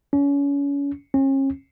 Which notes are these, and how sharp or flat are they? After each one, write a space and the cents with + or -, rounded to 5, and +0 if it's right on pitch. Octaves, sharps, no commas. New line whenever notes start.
C#4 +30
C#4 -40